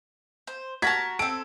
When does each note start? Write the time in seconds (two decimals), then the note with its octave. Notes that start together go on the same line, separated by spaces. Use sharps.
0.47 C5
0.82 F#4 A#4 A5 G#6 B6
1.19 C4 A4 D7